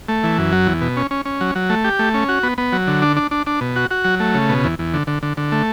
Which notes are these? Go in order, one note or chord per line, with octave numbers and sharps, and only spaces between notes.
A3
E3
F#2
F#3
E2
B2
C#4
C#4
C#4
F#3
F#3
A3
G4
A3
C#4
F#4
B3
B3
F#3
D3
D4
D4
D4
D4
B2
F#4
F#4
F#3
A3
C#3
B2
E2
E2
D3
D3
D3
D3
A3